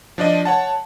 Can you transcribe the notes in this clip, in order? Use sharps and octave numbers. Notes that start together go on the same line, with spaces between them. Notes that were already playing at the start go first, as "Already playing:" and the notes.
F3 D4 D5 D#5
C#5 F#5 A5